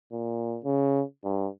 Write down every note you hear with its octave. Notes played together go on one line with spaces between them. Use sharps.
A#2
C#3
G2